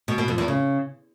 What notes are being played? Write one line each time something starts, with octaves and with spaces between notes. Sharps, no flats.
B2
B2
F2
E2
C#3